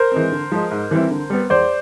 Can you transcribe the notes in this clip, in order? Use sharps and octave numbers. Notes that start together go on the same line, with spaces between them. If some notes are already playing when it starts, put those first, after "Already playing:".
Already playing: A#4 C5
E3 G#3 C4
D3
F3 G#3
G#2
E3 G3 C4 E4
D3
G3 B3
E2 C5 D5